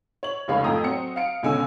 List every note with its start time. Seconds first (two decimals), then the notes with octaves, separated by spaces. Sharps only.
0.23 C#5 F#7
0.48 F1 C#2 C#5 F5 B5
0.64 F2 A2 G5 A#5 D#6
0.84 F#3 C4 C#7
1.16 F5 C#7 D7
1.43 C#2 B2 D3 C#4 G#5 E6